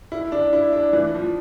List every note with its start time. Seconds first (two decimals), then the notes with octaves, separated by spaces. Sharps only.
0.12 E4
0.32 D4
0.53 E4
0.73 D4
0.93 E3
1.15 F3